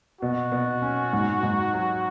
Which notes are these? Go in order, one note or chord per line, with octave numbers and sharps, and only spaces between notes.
B2 F#4
B2
C#4
G#2
G#2
F#3